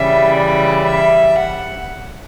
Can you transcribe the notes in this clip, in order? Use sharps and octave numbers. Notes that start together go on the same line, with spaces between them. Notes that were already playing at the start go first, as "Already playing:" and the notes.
Already playing: C#3 E3 G3 E5
D5
E5
F#5